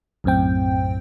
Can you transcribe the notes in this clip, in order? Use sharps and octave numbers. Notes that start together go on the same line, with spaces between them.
B1 F#2 A2 C4 G5